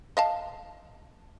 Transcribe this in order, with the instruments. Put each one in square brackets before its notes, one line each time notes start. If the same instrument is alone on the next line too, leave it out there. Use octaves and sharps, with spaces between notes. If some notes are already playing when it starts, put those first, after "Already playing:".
[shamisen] D#5 F5 A5